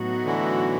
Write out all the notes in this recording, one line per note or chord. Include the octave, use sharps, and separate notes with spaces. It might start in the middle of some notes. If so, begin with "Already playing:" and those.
Already playing: A2 F#3 B3 D#4 F#4
D3 E3